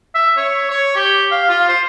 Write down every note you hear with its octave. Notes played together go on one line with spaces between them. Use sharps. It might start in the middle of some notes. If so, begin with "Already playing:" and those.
E5
C#5
C#5
G4
F5
F4
C5